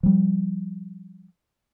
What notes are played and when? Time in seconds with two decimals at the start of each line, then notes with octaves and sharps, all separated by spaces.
0.03 F3 G3